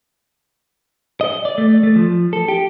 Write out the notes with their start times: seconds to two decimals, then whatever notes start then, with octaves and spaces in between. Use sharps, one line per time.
1.21 D#5
1.45 D5
1.58 A3
1.83 A3
1.96 F3
2.33 A4
2.48 G4